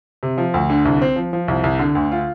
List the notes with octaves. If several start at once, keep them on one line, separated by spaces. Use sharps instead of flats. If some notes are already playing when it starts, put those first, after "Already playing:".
C3
F3
D2
D3
C2
C4
F3
F3
C2
C2
D3
D2
F4